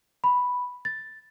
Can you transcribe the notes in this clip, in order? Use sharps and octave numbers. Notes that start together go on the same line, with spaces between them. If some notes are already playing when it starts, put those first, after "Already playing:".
B5
A6